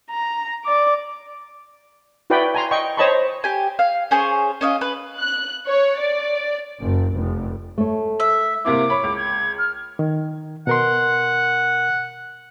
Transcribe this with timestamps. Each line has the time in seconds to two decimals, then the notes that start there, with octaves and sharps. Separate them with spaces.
0.11 A#5
0.65 D5 D6
2.30 E4 F#4 B4 D5 G5 B5
2.55 G#5 A#5 C6
2.71 D#5 G5 C#6
2.97 C5 C#5 D#5 A5 B5 C#6
3.44 G4 G#5
3.79 F5
4.11 C#4 G#4 C5 C#5
4.61 C#4 D#5 F5
4.81 B4
5.17 F#6
5.68 C#5
5.97 D5
6.80 F#1
7.14 F1
7.78 A3 C#5
8.20 E5
8.65 C3 A#3 E4 D6
8.90 C#5 B5
9.03 C#2
9.17 G#6
9.58 F6
9.99 D#3
10.67 B2 A#4 F#5 C6